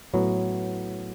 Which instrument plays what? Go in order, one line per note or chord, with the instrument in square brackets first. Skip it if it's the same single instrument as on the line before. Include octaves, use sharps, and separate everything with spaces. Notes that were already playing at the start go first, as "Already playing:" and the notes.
[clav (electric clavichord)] A2 F#3 B3